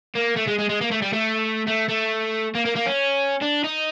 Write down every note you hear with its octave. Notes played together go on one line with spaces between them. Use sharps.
A#3
A3
G#3
G#3
G#3
A#3
A3
G3
A3
A3
A3
A#3
A#3
A#3
C#4
D4
D#4